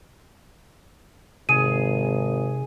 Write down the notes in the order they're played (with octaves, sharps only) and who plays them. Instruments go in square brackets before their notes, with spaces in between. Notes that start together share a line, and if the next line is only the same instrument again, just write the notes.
[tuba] G#1 [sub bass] C3 [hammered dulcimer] G#4 [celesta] D#7